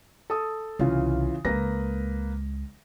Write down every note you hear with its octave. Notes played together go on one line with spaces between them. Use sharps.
A4 D#6
C2 C#3 E3 F4
C#2 G#3 A#3 B4 A#6